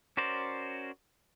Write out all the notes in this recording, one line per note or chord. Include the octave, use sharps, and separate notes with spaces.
C#4 F#4 A#4 C5 D5